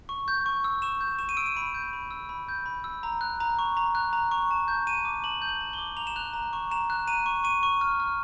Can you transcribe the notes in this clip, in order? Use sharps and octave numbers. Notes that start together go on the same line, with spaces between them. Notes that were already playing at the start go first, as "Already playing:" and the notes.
C#6
G6
C#6
E6
C#6 E7
G6
C#6 E7
D#7
E6 D7
D#7
B5 D7
G6
B5
E6
B5
G6
B5
E6
A#5
F#6
A#5
C#6
A#5
F#6
A#5
C#6
A5
G6
A5 D#7
D6
A5 F#7
G6
F#7
A5
D6 G7
A#5 F7
E7
F#6 F7
A#5
C#6
A#5 E7
F#6
A#5 D#7
C#6
C#6 D#7
C#6
F6
F6